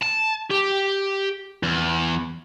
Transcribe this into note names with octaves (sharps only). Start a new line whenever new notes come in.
A5
G4
E2